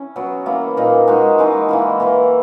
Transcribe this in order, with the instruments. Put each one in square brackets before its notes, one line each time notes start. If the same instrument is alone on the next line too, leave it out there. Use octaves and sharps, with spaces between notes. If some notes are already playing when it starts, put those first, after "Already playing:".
Already playing: [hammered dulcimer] C#4 E4
F#3 B3 F#4
E3 A#3 E4
A#2 A#3 D#4
G#3 D#4 F#4
E3 G#3 D#4
E3 A#3 E4
E3 A#3 E4